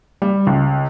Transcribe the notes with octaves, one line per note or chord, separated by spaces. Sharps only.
G3
C#2